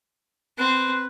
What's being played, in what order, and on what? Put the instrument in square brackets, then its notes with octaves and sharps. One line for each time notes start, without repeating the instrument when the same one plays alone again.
[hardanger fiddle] C4 [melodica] B4